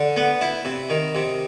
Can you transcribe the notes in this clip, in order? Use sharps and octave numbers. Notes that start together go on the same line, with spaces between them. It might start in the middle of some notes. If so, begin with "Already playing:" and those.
Already playing: D3
B3
E4
C3
D#3
C3